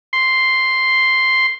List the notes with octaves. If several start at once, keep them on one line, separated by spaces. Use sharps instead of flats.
C6